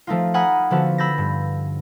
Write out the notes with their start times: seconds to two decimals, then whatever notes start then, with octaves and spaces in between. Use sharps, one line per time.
0.07 F3 A3 D#4 F4
0.34 F#5 G#5 A#5 B5 D#6 F6
0.70 D3 F3 B3 F#4 A4
0.98 B5 E6 G6 A6 A#6
1.18 G2